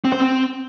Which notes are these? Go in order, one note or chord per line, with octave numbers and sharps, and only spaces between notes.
C4
C5
C4